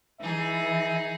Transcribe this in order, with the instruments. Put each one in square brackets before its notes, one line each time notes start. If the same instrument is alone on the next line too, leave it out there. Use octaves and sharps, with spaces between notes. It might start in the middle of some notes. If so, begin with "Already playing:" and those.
[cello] E3 [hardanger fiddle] D#4 G#4 [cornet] E5